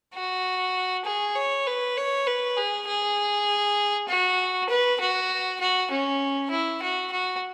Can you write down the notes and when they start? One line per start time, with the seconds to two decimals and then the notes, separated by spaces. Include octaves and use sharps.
0.15 F#4
1.05 G#4
1.36 C#5
1.67 B4
1.97 C#5
2.27 B4
2.57 G#4
2.88 G#4
4.08 F#4
4.69 B4
5.00 F#4
5.61 F#4
5.91 C#4
6.51 E4
6.82 F#4
7.12 F#4